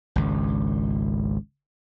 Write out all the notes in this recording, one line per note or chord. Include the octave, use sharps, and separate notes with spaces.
G#1 C#2